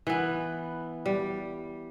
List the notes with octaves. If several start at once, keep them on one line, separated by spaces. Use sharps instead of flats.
E3 B3
G3